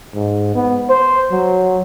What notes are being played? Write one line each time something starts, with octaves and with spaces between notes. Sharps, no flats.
G#2
B3
C5
F#3